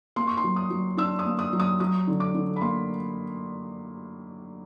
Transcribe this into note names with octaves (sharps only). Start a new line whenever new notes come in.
A#3 C6
C#6
C6
F#3
D#6
F#3
D4 E6
D#6
A#3
D#6
F#3
D#6
F#3 D#6
D3
D6
D3
B5
A#3 C6